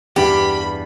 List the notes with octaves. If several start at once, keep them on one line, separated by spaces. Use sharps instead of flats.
E2 G2 G4 B5